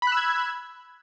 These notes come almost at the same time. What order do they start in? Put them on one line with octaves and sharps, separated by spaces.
B5 F#6 E6 G#6